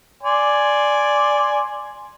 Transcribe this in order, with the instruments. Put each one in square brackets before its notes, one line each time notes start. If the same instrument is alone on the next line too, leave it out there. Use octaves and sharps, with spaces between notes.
[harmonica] D5 G#5 C6